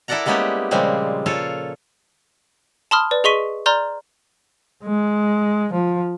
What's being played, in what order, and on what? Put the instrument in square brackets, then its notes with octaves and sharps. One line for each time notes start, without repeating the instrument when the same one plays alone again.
[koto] E4 A4 A#4 D5 F#5 A#5
G3 G#3 A#3 B3 C#4 G4
A#2 C#3 F3 G3 G#3 C4
A#2 F4 A4 C#5 F5
[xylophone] A5 B5 C6 D#6 F6
B4 D5
G#4 D#5 C6 C#6 B6 D#7
D5 A#5 C6 F6 G6
[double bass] G#3
F3